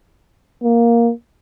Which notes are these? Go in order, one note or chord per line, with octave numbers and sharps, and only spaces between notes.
A#3